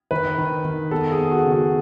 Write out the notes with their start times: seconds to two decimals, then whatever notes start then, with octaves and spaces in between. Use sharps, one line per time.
0.11 D#3 B4
0.38 D#3
0.65 D#3
0.91 B3 A4
1.11 G#4
1.18 B3
1.31 F#4
1.45 C#3
1.52 F#4